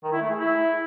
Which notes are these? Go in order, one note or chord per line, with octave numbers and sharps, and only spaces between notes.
D#3
E4
A3
G#4
E4